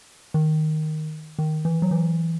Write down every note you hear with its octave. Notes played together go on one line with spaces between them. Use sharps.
D#3
D#3
E3
F#3
E3